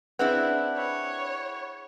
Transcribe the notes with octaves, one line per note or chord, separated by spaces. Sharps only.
C4 D4 E4 G#4 B4 F#5 F#6
C#5 B5